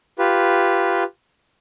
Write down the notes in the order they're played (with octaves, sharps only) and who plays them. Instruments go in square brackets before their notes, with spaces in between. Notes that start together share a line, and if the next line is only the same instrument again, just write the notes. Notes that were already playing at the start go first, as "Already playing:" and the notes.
[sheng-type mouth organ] F4 G4 B4